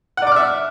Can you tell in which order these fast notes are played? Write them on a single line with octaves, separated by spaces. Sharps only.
F#5 D5 D6 F6 E5